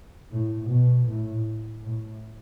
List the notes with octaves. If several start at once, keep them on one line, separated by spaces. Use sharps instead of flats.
A2
B2
A2
A2